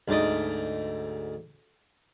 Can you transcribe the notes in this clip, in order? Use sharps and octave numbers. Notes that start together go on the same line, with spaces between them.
D2 G#2 D5 D#5